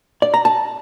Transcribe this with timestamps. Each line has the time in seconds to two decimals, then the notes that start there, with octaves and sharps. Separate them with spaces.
0.22 D5
0.34 A#5
0.45 A5